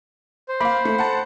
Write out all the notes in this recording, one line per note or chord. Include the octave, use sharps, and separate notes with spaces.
C5
A#3 F5 B5
A3
F#5 A5